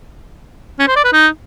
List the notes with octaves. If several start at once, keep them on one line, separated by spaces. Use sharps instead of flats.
C#4
C5
D5
B4
D#4